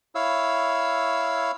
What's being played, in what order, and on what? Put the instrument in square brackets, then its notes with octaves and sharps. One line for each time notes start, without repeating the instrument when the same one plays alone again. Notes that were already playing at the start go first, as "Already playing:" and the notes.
[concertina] E4 C#5 F5 E6